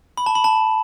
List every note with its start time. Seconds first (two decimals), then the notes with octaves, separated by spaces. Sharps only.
0.17 B5
0.26 A5
0.35 B5
0.44 A5